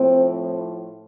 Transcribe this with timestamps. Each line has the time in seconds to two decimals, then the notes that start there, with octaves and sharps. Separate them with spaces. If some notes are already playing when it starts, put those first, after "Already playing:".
Already playing: A2 F3 C4